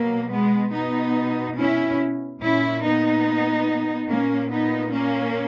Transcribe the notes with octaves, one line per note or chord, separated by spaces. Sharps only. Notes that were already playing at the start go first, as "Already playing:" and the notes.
Already playing: B2 F#3 A#3
G#3 B3
B2 B3 D#4
C#4 E4
A#2 C#4 E4
B3 D#4
A#2 A#3 C#4
B3 D#4
A#3 C#4